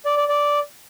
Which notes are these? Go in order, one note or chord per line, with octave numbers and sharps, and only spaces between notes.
D5
D5
D5